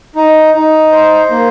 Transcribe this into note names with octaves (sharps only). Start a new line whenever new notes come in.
D#4
D#4
C5
A#3